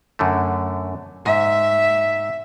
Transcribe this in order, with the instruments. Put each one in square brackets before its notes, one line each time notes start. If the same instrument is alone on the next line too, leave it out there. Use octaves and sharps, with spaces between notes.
[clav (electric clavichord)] F#2 D3 A3
[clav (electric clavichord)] G#2 [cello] E5